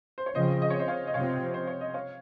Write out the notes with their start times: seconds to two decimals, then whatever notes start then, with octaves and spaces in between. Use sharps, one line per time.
0.18 C5
0.26 C#5
0.35 C#3 F3 C4 C5 D#5
0.62 D#5
0.70 C#5
0.79 C5 D#5
0.88 C#5 F5
1.07 D#5
1.14 C3 F3 C4 C#5 F5
1.54 C5
1.67 C#5
1.81 D#5
1.94 C#5 F5